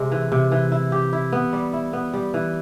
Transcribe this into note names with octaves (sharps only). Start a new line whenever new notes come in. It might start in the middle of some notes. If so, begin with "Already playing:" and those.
Already playing: C3 G#3
E3
C3
E3
E4
G4
E4
B3
G3
E4
B3
G3
E3